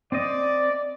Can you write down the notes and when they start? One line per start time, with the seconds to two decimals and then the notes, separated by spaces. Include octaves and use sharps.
0.12 C4 C5 D5 D#5